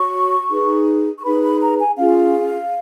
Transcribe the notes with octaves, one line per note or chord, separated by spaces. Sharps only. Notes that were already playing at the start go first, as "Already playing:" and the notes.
Already playing: F#4 C#5 C#6
D#4 G#4 B4
C#6
D#4 G#4 B4 B5
B5
A#5
G#5
C#4 F4 G#4 F5